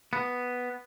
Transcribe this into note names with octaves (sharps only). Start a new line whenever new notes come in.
B3